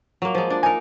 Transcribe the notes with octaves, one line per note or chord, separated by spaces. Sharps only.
F#3 A#3
F3 G#3
D4
D#4 A#4 G#5